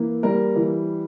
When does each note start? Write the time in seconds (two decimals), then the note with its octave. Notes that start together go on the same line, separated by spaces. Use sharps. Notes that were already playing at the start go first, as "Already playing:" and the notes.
Already playing: E3 A#3
0.23 G3 A#4
0.56 E3